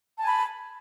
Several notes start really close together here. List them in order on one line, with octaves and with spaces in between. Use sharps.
A5 G#5 B5